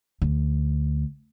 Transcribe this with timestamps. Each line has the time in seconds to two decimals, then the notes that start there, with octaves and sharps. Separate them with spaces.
0.22 D2